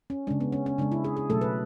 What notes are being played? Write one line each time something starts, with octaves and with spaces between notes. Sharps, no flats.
C#4
C#3 G#3 D4
B3
C#4
C#4
C#3 G#3 D4
E4
G#4
G#4
B2 F#3 A3 A4
B4